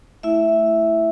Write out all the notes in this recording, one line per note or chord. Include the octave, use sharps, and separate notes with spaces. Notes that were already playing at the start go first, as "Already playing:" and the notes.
A3 E4 E5